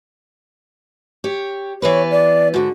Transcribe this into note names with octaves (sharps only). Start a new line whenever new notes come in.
G4 C#5
E3 B3 B4 C#5
D5
G#2 D3 F#4